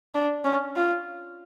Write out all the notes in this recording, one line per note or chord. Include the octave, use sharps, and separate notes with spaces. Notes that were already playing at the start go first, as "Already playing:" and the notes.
D4
C#4
F4